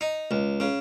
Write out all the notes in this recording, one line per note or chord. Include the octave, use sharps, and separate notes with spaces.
D#4
C#2
C#3